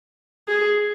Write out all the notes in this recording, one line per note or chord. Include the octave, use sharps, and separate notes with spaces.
G#4